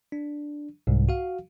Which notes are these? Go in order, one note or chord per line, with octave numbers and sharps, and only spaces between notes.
D4
C2 G#2
F#4 F5